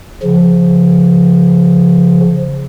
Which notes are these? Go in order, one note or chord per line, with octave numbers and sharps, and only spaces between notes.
C#3 F3